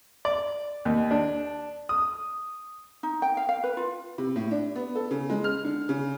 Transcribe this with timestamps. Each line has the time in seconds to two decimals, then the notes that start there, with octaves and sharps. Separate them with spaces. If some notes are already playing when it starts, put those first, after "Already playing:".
0.25 D5
0.85 D#2
1.11 D4
1.89 D#6
3.03 D#4
3.22 G5
3.37 F5
3.49 F5
3.64 B4
3.77 F4
4.18 C3
4.36 A2
4.51 D4
4.75 B3
4.95 A4
5.11 C#3
5.30 G#3
5.44 F6
5.64 D3
5.89 C#3